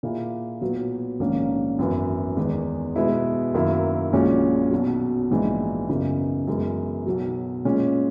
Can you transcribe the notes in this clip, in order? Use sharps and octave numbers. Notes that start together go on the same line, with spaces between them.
A#2 A#3 E4 G#4
B1 A#2 F#3 B3
A#1 G#2 D#3 A#3 C#4
G#1 F#2 E3 B3
E2 D#3 G#3 B3
B2 G#3 B3 E4
F#2 D#3 A#3 E4
A#1 A#2 G#3 C#4 F#4
B1 B2 F#3
A#1 G#2 E3 G#3 D#4
F#2 C#3 E3 B3 D#4
F#2 E3 G#3 B3
B1 B2 F#3
A#2 G#3 C#4